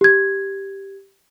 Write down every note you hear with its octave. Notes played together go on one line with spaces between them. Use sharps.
G4 G#6